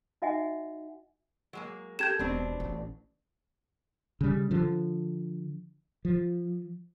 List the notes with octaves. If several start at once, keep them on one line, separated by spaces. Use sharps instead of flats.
D#4 F#4 D#5 E5 F#5 G#5
F#3 G#3 A#3
G4 A4 A#4 G6 G#6 E7
E1 B2 C4 D4
A1
C#3 G3
D3 F3
F3